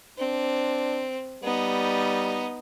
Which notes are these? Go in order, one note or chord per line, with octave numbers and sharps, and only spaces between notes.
C4 D4
G3 B3 D#4